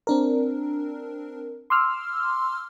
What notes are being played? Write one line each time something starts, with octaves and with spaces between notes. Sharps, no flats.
C4 D4 A#4
C6 D6 E6 F6